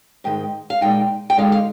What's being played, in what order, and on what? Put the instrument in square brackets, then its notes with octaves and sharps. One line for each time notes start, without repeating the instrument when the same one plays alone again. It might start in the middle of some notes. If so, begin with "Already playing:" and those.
[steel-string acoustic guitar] G#2 D#3 G#3 G5
F5
A#2 G#3 D#4 G5
G5
D3 G#3 D#4 F5
F5